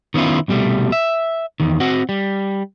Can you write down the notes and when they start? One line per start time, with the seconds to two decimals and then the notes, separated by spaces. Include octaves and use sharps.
0.14 D#3 B3 C#4 E4 F4
0.48 C2 B2 G3 A3
0.92 E5
1.60 E2 D#3
1.80 C4 F#4 F#5
2.09 G3